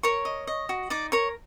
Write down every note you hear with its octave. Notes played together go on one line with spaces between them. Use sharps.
A#4 C#5 C#6
D#5
D#5
F#4
D#4 D5 D6
A#4 C#5 C#6